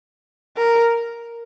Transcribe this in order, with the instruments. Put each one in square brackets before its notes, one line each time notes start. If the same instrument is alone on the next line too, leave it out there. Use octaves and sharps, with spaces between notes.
[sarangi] A#4